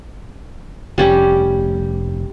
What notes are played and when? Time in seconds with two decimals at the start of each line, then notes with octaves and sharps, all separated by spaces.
0.98 F1 G3 C#4 G4